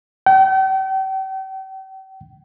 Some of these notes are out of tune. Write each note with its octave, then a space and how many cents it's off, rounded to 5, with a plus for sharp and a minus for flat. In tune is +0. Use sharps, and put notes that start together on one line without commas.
G5 -40